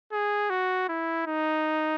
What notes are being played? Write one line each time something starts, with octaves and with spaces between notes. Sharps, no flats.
G#4
F#4
E4
D#4